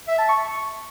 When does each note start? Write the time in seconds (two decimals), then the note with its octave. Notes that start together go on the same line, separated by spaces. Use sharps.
0.08 E5
0.18 A5
0.29 C#6